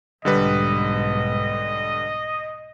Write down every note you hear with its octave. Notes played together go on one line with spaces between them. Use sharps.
B1 G#2 D3 G3 B4 D#5